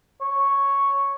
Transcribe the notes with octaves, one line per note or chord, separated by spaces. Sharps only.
C#5